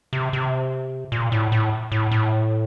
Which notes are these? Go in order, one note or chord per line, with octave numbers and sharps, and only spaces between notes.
C3
C3
A#2
A2
A2
A2
A2